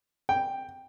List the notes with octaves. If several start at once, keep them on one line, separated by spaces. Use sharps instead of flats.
G5